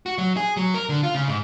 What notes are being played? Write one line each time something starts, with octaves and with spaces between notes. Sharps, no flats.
F#4
F#3
G#4
F#3
A#4
D3
F4
C#3
G#2